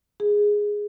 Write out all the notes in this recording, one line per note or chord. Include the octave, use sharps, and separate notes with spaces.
G#4